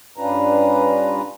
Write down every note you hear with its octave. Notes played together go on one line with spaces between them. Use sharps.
G2 C#4 D4 F4 B4 A#5